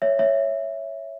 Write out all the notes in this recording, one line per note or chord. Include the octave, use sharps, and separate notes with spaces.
C#5 E5
C#5 E5